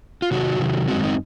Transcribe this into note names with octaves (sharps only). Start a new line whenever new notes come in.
F4
C3 D#3 F#3 F#4
C3 D#3 F#3
F#2 D#3 G#3 C4 F#4
D#4